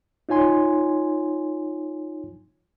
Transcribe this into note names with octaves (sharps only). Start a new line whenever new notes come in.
D#4 F4 C#5 G#5 C6